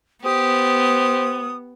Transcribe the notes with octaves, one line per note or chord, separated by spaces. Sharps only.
B3 G4 C5 D#6